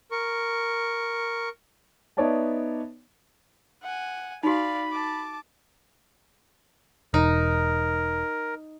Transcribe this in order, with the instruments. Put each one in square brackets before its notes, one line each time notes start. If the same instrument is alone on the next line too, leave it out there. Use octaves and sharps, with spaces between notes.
[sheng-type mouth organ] A#4 C#6
[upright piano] B3 D#4 C#5 D5 E5 A5
[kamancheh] F#5 G#5
[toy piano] D#4 F#4 [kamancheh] D5 F5 [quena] B5
[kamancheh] A5 D6
[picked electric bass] E1 [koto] D#4 [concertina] A#4